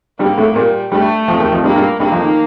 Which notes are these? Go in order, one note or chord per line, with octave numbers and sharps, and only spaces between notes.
G2 G3 A#3
A2 A3
A#2 G3 A#3
G2 G3 A3
F2 F3
D#2 D#3
F2 F3
G2 G3 A#3
G2 G3
G2 G3 A#3
F2 F3
D#3